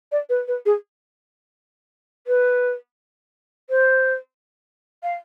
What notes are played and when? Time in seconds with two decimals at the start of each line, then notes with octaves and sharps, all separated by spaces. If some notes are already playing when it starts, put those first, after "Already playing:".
0.12 D5
0.29 B4
0.48 B4
0.66 G#4
2.27 B4
3.70 C5
5.03 F5